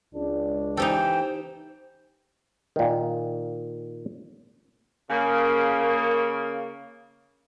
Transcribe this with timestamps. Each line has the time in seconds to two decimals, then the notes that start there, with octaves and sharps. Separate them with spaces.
0.14 C#2 D4
0.77 E3 D#4 G4 A4 C5 G5
2.76 A#2 D#3
5.10 C#3 A#3